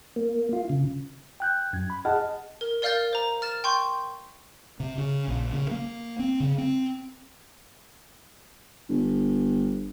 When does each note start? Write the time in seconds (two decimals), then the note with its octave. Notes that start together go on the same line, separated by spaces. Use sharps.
0.16 A#3
0.53 F4
0.69 C#3
1.40 G5 F#6 G6
1.73 F#2 G#6
1.90 B5
2.05 G#4 D#5 F#5 A5 F6
2.61 A#4
2.82 A#4 D5 F5 F6 G6 A6
3.13 C5 A#5
3.42 F6 A6 E7
3.64 G5 C6 C#6 G6
4.80 C3
4.98 C#3
5.28 A#1
5.52 C#3
5.71 A#3
6.19 C4
6.40 C#3
6.58 C4
8.89 G1